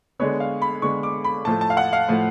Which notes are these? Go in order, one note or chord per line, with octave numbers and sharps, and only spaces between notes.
D3 G#3 B3 C#5
F5
B5
D3 G#3 B3 C#6
D6
B5
A2 F3 A3 A5
A5
F5
F#5
F5
A2 F3 A3